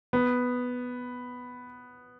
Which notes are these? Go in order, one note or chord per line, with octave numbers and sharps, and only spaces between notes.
B3